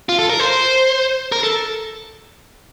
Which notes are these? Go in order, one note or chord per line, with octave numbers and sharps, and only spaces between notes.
F4
A4
A#4
C5
A#4
A4